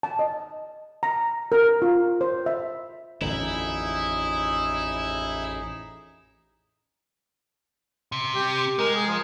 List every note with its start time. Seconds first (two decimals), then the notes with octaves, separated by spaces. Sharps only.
0.03 A5
0.19 D#5
1.03 A#5
1.52 A#4
1.82 F4
2.21 C5
2.46 E5
3.21 A1 F2 D3 D#4 E4 G#4
8.12 C3
8.35 G4
8.79 G#3 A#4
8.95 G#4
9.07 F3